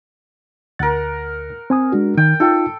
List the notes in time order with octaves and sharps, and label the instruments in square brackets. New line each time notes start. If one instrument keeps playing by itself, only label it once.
[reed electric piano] D2 A6 [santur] A#4 F#5
[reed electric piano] C4 G#5 D#6
G#3 D4 F#4
[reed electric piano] D#3 [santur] G5
[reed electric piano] D#4 F4 G5 [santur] A4